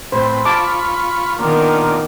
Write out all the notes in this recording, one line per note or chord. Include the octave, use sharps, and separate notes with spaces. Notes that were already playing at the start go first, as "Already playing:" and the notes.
A2 C4 B4 C5
F4 A5 B5 C#6 D6
D#3 A#3 B3 D4 F4